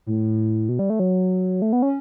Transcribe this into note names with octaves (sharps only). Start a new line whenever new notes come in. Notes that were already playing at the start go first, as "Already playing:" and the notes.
A2
B2
G3
A3
F#3
A3
B3
C#4